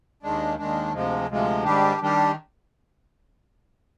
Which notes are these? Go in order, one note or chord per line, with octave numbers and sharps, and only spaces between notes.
D#2 D#3 G#3 D4
D#2 D#3 G#3 D4
D2 C3 F3 G#3
D2 C3 F3 G#3
G#2 D#3 G3 D4 G4
D#3 G3 D4 G4